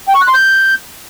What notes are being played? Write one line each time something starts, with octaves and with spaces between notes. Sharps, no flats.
G5
C#6
F#6
C6
G6